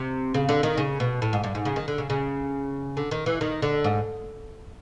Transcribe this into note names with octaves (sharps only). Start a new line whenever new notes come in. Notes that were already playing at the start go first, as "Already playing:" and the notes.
Already playing: C3
C#3
D3
D#3
C#3
B2
A2
G#2
G2
G#2
C#3
D#3
D3
C#3
C#3
D3
D#3
E3
D#3
D3
G#2